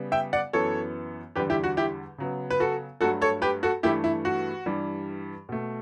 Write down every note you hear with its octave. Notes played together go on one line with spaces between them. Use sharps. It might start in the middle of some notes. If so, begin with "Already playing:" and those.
Already playing: C#3 G3 B3
E5 G5
D5 F#5
F#2 E3 B3 A4 C#5
E2 D3 G3 G4 B4
E4 G4
F#4
E4 G4
C#3 F#3 B3
B4
F#4 A4
G2 F#3 A3 F#4 A4
A4 C#5
G4 B4
F#4 A4
G2 E3 A3 E4 G4
E4
F#4
G2 E3 G3
B2 A3